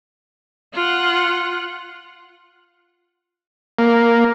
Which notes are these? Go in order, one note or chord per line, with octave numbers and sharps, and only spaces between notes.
F4 F#5
A#3